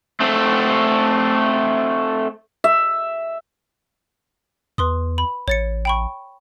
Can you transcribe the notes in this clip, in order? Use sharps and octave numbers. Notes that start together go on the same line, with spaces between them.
A3 C4
E5
E2 B4 C6 D#6
B5
A1 C#5 A6 C#7
G5 B5 C#6